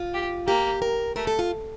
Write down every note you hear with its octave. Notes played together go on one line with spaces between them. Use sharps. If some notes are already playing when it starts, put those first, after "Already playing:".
Already playing: F4
G4
A#3 G4
A#4
A3 A#4
A4
F4